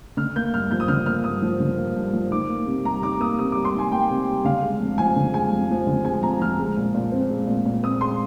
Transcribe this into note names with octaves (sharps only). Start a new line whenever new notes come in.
D3 F6
A#3 G6
G2 F6
F3 G6
D#6
D3 F6
A#3 F6
G2 D#6
F3
D3
A#3
G2
F3
D#3 D6
A#3
C3
G3 A#5
D#3 D6
A#3 D#6
C3 D#6
G3 D6
C6
D#3 G#5
A#3 G5
C3
G3
D3 F5
G#3
F2
F3 G#5
D3
G#3 G#5
F2
F3
D3
G#3 G#5
F2 A#5
F3 F6
G#3
A#2
A#2
C4
G#3
A#2
A#2
C4 D#6
G#3 C6